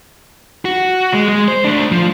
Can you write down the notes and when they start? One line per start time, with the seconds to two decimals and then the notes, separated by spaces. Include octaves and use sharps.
0.65 F#4
1.14 G#3
1.29 G#3
1.48 C5
1.65 A3 D4
1.92 F3